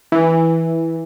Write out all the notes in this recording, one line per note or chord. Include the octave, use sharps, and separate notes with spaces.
E3